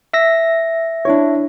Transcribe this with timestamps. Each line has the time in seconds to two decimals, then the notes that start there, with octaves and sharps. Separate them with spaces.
0.13 E5 E6 A#6
1.05 D4 E4 C#5